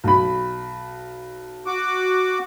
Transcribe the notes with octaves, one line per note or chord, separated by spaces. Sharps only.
B1 B5
F#4 D6